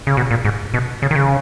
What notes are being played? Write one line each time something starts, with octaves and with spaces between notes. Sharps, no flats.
C#3
B2
A#2
G#2
B2
C#3
D#3
C#3